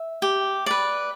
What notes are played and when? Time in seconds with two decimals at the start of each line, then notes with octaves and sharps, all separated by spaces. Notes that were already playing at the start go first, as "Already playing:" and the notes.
Already playing: E5
0.22 G4
0.66 B4 D5